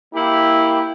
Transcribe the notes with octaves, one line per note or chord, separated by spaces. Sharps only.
A#3 E4 G4